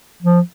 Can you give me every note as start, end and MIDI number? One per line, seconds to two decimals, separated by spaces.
0.23 0.40 53